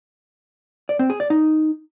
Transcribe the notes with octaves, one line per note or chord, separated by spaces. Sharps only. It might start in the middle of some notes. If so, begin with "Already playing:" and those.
D5
C4
G#4
D5
D#4